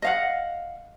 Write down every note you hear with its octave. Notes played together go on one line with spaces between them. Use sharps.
D#5 F5 F#5